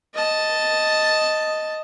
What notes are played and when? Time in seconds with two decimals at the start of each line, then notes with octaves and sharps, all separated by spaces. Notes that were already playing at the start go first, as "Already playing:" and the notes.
0.14 D#5 A5